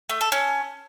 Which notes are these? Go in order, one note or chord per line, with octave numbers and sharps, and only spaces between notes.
A3
A4
C#4